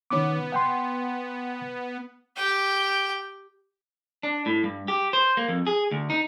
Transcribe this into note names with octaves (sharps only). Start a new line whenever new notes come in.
D#3 B3 C#4 D6
F#5 G5 C6
G4 G5
D4
A2
G2
G4
C5
A#3
F2
G#4
D2
D#4